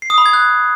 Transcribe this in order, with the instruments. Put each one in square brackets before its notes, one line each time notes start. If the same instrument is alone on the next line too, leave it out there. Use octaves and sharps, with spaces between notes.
[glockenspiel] C7
D#6
B5
G#6
F#6